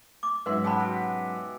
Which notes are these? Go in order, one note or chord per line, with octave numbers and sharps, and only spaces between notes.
D6
G#2 F#3 C#4 B4 E5 F#5 C6
G#3 G4 F#5 G5 A5 B5
B2